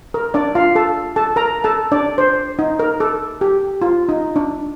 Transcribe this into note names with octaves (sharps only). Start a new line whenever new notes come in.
A#4
D4 D5
F4 F5
A4 A5
A4 A5
A#4 A#5
A4 A5
D4 D5
C5
D#4
A#4
A4
G4
F4
D#4
D4